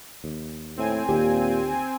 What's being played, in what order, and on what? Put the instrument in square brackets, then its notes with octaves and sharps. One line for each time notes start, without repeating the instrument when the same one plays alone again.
[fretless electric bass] D#2
[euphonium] A2 [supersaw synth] C4 G#5
[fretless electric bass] D#2 [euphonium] A#2 [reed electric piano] G4